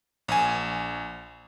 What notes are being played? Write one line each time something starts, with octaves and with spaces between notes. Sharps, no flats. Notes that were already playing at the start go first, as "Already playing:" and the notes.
A#1 G#5